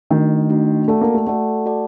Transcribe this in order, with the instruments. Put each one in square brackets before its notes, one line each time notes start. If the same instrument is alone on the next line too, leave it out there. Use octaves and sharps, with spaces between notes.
[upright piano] D#3 [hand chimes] A3 D4 F#4
[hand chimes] A3 D4 F#4
[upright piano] A3 [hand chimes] F#4 A4 D5 F#5 A5
[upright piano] A#3
A3
[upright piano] A3 [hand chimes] F#4 A4 D5 F#5 A5
[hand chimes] F#4 A4 D5 F#5 A5